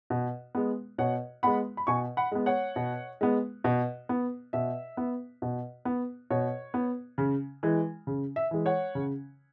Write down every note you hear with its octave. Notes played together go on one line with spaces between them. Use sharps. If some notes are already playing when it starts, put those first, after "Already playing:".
B2
G#3 B3
B2 C#5 F#5
G#3 B3 F#5 B5
B5
B2 G#5 C#6
F#5 B5
G#3 B3
C#5 F#5
B2
G#3 B3
B2
B3
B2 E5
B3
B2
B3
B2 C#5
B3
C#3
E3 G#3
C#3
E5
E3 G#3
C#5 F#5
C#3